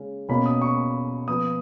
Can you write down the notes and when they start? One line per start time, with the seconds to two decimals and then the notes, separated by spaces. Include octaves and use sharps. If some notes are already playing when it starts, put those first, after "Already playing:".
Already playing: C#3 G#3 C#4
0.29 B2 A#3 C#4 B5
0.46 D#6
0.62 C#6
1.28 F3 B3 D#6